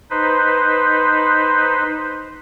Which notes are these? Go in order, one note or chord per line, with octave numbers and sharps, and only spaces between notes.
D#4 B4 C5